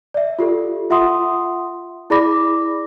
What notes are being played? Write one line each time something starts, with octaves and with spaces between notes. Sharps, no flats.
D5 E5
F4 G4 A4
F4 E5 F#5 C6 D#6
E4 G#4 D5 B5 D6 A#6